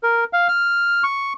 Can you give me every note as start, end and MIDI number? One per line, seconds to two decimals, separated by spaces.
0.03 0.24 70
0.33 0.48 77
0.48 1.03 89
1.04 1.33 85